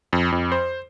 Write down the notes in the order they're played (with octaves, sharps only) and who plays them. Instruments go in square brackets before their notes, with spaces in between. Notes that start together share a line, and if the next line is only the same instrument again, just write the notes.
[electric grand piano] F2
F2
C5